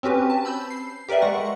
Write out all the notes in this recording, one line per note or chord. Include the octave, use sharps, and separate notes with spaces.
C4 C#4 F#4 G4 B4
A5
B5 E6 G6
C7
G4 A#4 B4 D5 E5
G#3 F#5 C#6